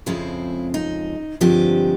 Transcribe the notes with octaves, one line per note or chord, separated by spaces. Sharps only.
F2 C#3 F3 G#3 C4 E4
D#4
G2 D3 F3 G#3 C4 G4